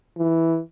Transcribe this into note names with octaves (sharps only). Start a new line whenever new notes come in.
E3